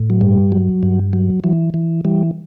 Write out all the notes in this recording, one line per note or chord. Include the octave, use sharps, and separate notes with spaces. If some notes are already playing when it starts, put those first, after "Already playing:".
Already playing: A2
F#3
G2 G3
F#3
G2
F#3
E3 F#3
E3
E3 G3